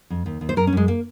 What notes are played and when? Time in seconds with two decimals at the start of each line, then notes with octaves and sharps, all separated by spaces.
0.10 F2
0.26 D#2
0.41 D#2
0.49 C5
0.56 F#2 A#4
0.67 C#4
0.72 F#2 G#3
0.88 A#3